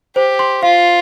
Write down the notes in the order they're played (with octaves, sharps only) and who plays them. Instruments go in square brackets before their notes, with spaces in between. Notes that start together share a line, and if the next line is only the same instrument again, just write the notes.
[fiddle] G4 [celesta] C5
[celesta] C6
[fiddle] F4 [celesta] F5